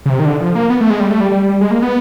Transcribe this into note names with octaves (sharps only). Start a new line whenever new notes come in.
C#3
C3
D#3
D3
F3
A#3
B3
A3
G#3
G3
A3
G3
G3
G#3
A#3
B3